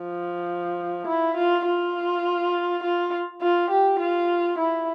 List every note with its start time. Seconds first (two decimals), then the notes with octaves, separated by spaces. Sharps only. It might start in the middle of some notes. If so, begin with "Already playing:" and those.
Already playing: F3
1.07 E4
1.36 F4
1.66 F4
2.83 F4
3.41 F4
3.70 G4
4.00 F4
4.58 E4